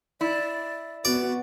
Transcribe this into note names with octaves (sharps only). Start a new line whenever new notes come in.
E4 D5
B3 F#4 D5